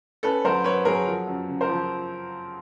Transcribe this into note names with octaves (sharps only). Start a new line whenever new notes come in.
C#4 A4 B4
F#3 A#4 C5
F#3 B4 C#5
F#3 G#4 A#4
F3
F#2
C#3
A#4 C5
F3